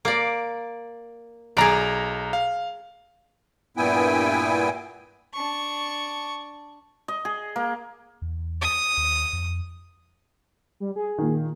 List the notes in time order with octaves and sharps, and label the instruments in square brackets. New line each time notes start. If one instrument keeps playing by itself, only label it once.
[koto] A#3 D5
[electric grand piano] B1 A#5 [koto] G#4 D5
[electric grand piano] F5
[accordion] G2 A#2 B3 E4 G5 G#5
[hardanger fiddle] D4 C#6
[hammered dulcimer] D#5
G#4
A#3
[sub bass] E2
[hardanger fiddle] D#6
[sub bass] D#2
F2
[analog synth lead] G3
G#4
[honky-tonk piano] A#2 D#3